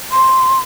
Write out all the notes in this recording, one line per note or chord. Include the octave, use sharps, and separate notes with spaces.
C6